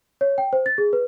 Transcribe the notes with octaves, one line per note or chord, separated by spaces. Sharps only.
C#5
G5
C5
A6
G#4
B4